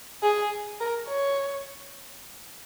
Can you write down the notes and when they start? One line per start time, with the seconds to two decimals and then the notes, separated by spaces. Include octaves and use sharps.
0.23 G#4
0.80 A#4
1.08 C#5